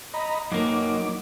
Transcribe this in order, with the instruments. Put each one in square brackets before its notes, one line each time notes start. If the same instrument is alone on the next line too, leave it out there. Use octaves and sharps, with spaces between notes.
[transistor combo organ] D#5 A#5 B5
[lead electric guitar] F#2 A#3 [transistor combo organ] F#3 D#4 D6